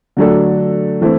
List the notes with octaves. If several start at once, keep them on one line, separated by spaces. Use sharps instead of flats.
D3 F#3 A3 D4 A4
E3 A3 C4 E4